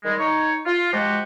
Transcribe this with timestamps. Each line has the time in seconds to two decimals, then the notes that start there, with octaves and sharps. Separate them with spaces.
0.03 D#3 G3 G#3
0.18 D#4 C#5
0.66 F4
0.93 F3 G#3 F#4 G4